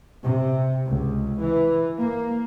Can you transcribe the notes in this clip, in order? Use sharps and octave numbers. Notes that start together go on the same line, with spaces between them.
C3
C#2
E3
A#3